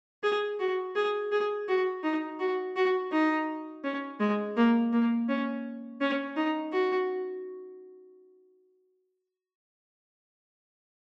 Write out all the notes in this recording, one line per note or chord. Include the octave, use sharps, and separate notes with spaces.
G#4
F#4
G#4
G#4
F#4
D#4
F#4
F#4
D#4
C#4
G#3
A#3
A#3
C#4
C#4
D#4
F#4